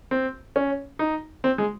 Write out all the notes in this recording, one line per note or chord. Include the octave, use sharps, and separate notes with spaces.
C4
C#4
D#4
C4
G#3